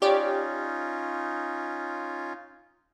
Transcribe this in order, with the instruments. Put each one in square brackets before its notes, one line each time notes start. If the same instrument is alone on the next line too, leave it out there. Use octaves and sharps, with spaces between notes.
[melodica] C#4 D#4 F4 [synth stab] G4 C#5 D5